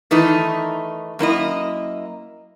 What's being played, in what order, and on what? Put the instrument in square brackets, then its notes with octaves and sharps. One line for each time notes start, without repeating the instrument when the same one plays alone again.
[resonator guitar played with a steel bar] D#3 E3 A3 D#4
F#2 A#3 E4 D#5